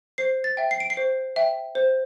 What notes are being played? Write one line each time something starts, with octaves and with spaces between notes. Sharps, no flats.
C5 C7
A6
E5 G5
C7
D7
C7
C5
E5 G5
C5